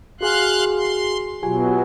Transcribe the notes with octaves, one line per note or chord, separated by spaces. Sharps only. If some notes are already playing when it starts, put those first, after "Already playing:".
F#4 G#4 F5 G#5 C6 F#6
C6
B2 F#3 F4 G4 G#5